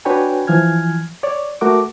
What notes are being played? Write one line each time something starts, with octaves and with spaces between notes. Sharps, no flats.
D4 F#4 B4 C#5 G5 G#5
E3 F3 G#5 F6 G#6
C#5 D5
A3 F#4 A#4 D6